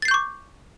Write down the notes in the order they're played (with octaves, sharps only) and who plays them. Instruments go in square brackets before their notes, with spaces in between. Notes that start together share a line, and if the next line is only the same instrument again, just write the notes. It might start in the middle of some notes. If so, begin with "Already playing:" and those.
[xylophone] A6
C7
G6
C#6
D6